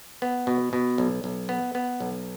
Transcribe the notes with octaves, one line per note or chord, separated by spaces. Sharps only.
B3
B2
B2
B1
B1
B3
B3
B1